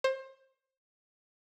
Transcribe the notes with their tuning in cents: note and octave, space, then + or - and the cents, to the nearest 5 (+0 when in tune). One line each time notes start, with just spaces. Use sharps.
C5 +25